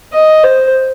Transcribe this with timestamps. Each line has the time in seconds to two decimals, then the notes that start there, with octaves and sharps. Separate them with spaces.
0.13 D#5
0.43 C5